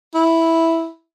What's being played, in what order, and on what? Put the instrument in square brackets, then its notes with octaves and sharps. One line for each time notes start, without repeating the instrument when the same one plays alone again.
[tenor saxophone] E4